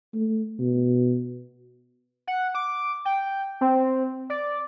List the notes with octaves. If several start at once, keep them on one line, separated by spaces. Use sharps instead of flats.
A3
B2
F#5
D6
G5
C4
D5